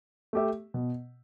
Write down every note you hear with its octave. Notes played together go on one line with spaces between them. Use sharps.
A3 G4 E5
B2